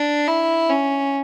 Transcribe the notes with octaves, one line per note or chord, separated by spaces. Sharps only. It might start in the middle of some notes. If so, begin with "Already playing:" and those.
Already playing: D4
E4
C#4